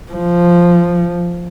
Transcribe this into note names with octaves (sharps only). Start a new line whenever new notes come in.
F3